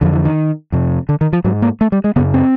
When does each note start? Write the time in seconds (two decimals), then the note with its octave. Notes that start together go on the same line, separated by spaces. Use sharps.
0.01 F2 D3 F3
0.13 E3
0.25 D#3
0.72 F2 C3
1.09 D3
1.21 D#3
1.33 F3
1.44 G#2 F#3
1.62 A#3
1.81 A3
1.92 G3
2.04 G#3
2.16 C#3 B3
2.19 F#2
2.34 C4